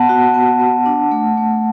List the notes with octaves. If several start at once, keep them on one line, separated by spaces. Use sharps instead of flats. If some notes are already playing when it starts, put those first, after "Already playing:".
Already playing: B3 F#5 A5
F#4
B3
B3
D4
A3
A3